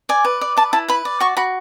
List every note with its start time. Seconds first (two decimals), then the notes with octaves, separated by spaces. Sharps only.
0.09 D5 G#5
0.25 B4
0.41 D5
0.57 B4 A5
0.73 E4 A5
0.88 B4 B5
1.05 D5
1.20 F#4 C#6
1.37 F#4 B5